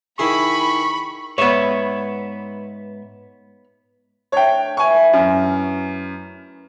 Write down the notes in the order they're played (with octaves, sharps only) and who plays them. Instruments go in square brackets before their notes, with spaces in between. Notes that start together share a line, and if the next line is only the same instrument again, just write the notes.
[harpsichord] D#3 E4 G#4 [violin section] B5 [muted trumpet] C#6
[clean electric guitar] G#2 B4 E5 [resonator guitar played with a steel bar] B3 C#5
[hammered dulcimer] A3 D4 [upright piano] C#5 G5
[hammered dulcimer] E3 [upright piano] G#5 C#6
[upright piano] F#2 [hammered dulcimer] C#4 A#4